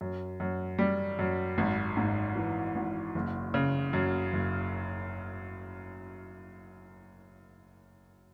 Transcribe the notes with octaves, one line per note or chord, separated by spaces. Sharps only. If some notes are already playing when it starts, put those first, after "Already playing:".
F#2
F#2
G3
F#2
G#1
G#2
E3
G#1
F#1
C#3
F#2
F#1